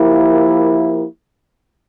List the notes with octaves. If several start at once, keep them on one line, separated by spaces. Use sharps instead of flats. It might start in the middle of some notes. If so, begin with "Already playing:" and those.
Already playing: F3 A#3 E4 G4 A#4